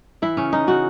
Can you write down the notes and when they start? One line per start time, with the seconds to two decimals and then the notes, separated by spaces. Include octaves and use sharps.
0.22 E3 E4
0.37 C#3 C#4
0.52 E3 D#4
0.67 C#3 F#4